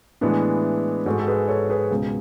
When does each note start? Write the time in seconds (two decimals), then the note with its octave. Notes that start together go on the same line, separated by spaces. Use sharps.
0.21 A2 E3 G#3 B3 D4
1.06 G#2 F#4 A4
1.10 G#3
1.19 A4
1.27 G#4 B4
1.48 A4 C#5
1.70 G#4 B4
1.91 C#2 B2 G#3